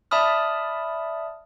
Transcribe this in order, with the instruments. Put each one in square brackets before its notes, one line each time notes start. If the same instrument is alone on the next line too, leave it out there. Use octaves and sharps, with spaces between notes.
[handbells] D5 E5 A5 B5 D#6 F6